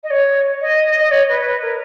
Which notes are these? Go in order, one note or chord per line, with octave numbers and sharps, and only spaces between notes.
D#5
C#5
D#5
D#5
C#5
B4
B4
A#4